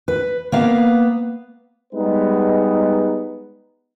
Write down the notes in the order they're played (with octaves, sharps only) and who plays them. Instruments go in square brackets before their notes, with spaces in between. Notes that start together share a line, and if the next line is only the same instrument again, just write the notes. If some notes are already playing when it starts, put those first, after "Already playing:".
[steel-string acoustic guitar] B4
A#3 B3 F5
[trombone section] G3 G#3 B3 D#4 B4